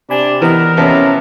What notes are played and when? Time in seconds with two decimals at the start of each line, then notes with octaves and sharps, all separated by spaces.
0.10 C3 D4 G#5 B5
0.42 E3 B3 A#4 D#5
0.77 C3 F3 B3 C#4